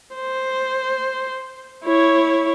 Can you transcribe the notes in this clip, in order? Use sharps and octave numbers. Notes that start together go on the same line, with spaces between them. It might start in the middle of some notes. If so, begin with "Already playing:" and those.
C5
E4 C#5